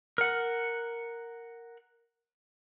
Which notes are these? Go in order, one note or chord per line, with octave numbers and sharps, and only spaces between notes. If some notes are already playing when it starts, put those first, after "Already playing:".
A#4 F#5